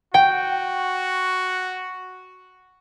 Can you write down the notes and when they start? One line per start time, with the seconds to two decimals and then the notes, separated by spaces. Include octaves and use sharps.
0.14 F#4 G5